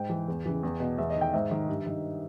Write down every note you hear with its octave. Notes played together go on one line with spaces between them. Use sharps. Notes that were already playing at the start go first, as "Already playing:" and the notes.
Already playing: G#2 G5
E3
E2
C#3 E3
E2
B2
E2 E5
D#5
D#3
G5
G#2 E5
D#3
G2
D#3